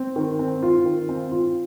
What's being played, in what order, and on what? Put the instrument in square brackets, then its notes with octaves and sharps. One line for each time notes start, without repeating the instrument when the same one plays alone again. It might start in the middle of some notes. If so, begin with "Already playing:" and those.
Already playing: [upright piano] C4
D#3
C4
F4
D#3
C4
F4